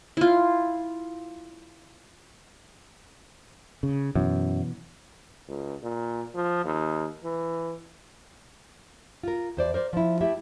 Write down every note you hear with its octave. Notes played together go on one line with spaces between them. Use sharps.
E4 F4
C#3
F#2 B2 E3
C#2
A#2
F3
D#2
E3
F4 A#4
E2 C5 D5
A#4 C5 D5
F3 E4
A3 E4 G4 E5